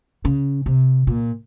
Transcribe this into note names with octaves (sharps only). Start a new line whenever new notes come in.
C#3
C3
A#2